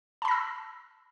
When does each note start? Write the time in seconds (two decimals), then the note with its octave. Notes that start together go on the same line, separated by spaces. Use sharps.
0.22 A5
0.25 B5
0.28 A#6
0.31 E6